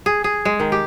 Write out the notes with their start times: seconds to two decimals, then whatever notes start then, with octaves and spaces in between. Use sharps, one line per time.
0.06 G#4
0.24 G#4
0.45 G#3
0.60 D#3
0.72 G4